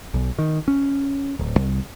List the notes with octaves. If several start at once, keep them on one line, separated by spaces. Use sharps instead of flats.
B1
D#3
C#4
D1
C2